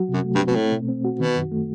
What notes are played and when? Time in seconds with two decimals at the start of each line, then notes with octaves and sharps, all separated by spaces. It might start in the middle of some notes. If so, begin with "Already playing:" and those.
Already playing: F#3 F#4
0.09 F#2 C3
0.24 A3
0.35 G2
0.40 C4
0.47 B2
0.55 A2 A3
0.72 B2
0.88 C4
1.05 F#4
1.20 B2 D#3
1.36 F#2
1.52 A3